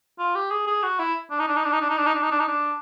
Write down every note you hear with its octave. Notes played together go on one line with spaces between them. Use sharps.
F4
G4
G#4
G#4
F#4
E4
D4
D#4
D4
D#4
D4
D#4
D4
D#4
D4
D#4
D4
D#4
D4
D#4
D4